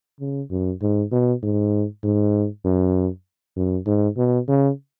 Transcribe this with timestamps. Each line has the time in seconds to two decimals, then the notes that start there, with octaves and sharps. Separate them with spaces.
0.20 C#3
0.51 F#2
0.82 G#2
1.12 B2
1.43 G#2
2.04 G#2
2.65 F#2
3.56 F#2
3.87 G#2
4.17 B2
4.48 C#3